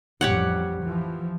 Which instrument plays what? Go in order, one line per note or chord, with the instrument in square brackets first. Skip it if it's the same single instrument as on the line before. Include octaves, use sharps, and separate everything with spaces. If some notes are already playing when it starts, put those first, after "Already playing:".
[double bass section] A1 F2 G3 [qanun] G4 C#5 F#5
[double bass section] E3 F3